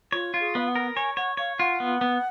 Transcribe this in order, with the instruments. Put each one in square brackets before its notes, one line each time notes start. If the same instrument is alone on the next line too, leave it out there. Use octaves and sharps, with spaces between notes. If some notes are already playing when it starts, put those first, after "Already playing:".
[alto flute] F4 [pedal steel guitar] C#5
[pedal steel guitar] F4
[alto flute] G#4
[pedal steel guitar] B3 [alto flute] F5
[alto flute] F#5
[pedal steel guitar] A#4
[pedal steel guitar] C#5 [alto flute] G#5
[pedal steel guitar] C#5 [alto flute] F#5
[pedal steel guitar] C#5 [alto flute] F5
[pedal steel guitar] F4 [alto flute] F#5
[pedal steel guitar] B3
B3